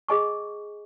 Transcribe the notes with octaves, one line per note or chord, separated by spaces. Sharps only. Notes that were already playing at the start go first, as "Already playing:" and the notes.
G#4 D#5 G#5 C#6